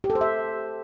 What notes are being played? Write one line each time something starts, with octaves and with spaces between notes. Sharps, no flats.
G4
A4
C5
E5